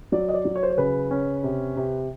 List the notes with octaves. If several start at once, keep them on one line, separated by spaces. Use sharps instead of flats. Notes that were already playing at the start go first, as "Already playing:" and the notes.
F#3 D5
D#5
D5
F#3
C#5
C5
C#5
C#3 B4
C#4
C3
C3